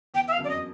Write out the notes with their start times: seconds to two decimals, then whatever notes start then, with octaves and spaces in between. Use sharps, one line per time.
0.14 E2 G5
0.28 E5
0.32 F5
0.36 F#2
0.40 F2 D5
0.49 D#5